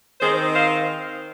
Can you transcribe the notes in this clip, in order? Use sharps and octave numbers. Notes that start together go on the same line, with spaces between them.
D#3 C4 D#4 G#4 C5
C5 F5